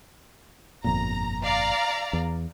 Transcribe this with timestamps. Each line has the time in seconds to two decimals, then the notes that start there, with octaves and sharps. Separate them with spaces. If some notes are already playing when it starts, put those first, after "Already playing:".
0.84 G1 F2 A#2 A#5
1.42 D5 F5 A#5
2.13 E2